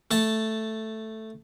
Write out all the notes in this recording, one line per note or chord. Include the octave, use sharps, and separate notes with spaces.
A3 A5